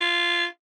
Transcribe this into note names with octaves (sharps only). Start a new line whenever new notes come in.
F4